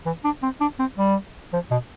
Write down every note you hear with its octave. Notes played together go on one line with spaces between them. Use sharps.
E3
D4
C4
D4
C4
G3
F3
B2